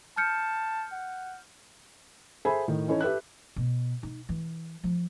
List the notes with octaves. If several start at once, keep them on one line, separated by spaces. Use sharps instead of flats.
A5 F6 G6 C#7
F#5
G#4 A4 C5 E5 G#5 B5
A2 D#3
E3 C#4 D#4 E4 A4 C#5
G4 A4 B4 E5 F#6
B2
D#4
E3
F3